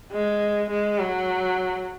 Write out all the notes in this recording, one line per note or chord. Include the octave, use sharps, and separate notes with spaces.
G#3
G#3
F#3